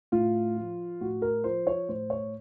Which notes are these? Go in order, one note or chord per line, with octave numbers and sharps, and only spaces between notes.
A2 F4
F3
A2 F#4
A#4
F3 C5
C#5
A2 C5
C#5